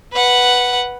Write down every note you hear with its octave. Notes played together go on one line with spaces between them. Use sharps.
B4 F#5